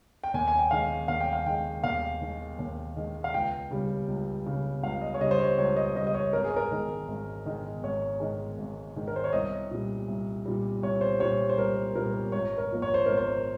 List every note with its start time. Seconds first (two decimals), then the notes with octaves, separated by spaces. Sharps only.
0.24 G5
0.34 D#2 G#5
0.48 G#5
0.59 G5
0.71 D#3 G#3 F5
1.08 D#2 F5
1.21 G5
1.33 F5
1.46 D#3 G#3 G5
1.83 D#2 F5
2.21 D#3 G#3
2.59 D#2
2.96 D#3 G#3
3.24 F5
3.34 C#2 G5
3.71 C#3 G3
4.08 C#2
4.46 C#3 G3
4.83 C#2 F5
5.02 D#5
5.14 C#5
5.21 C#3 G3 D#5
5.31 C5
5.39 C#5
5.58 C#2 C#5
5.77 D#5
5.95 C#3 G3 D#5
6.07 D#5
6.14 C#5
6.33 G#1 A#4
6.44 G#4
6.56 A#4
6.71 G#2 D#3 G#3
7.08 G#1
7.45 G#2 D#3 G#3
7.83 G#1 C#5
8.20 G#2 D#3 G#3
8.58 G#1
8.96 G#2 D#3 G#3
9.08 A#4
9.16 C5
9.24 C#5
9.33 C2 D#5
9.71 A#2 G3
10.08 C2
10.46 A#2 G3
10.83 C2 C#5
11.01 C5
11.20 A#2 G3 C#5
11.49 C5
11.58 C2 A#4
11.95 A#2 G3 A#4
12.32 G#1 C#5
12.58 A#4
12.70 G#2 F3 A#3
12.82 C#5
12.94 C5
13.06 G#1 A#4
13.17 C5